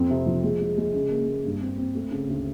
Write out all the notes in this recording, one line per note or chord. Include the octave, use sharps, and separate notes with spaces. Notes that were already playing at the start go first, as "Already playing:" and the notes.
Already playing: F2 C4
C3
F3
G#3
G#3
G#3
C#3
A#3
A#3
G2
C4
C4
A3
C#3
D2